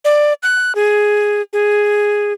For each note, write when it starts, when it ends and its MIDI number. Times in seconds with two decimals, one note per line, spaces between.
0.05 0.33 74
0.43 0.75 90
0.75 1.42 68
1.53 2.33 68